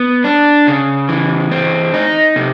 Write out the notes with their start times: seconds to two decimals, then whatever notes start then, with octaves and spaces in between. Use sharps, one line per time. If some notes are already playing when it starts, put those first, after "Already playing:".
Already playing: B3
0.24 D4
0.67 C#3
1.09 E3
1.51 C4
1.94 D#4
2.36 C3